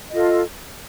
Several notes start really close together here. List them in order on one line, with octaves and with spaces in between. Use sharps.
D#5 F4 A4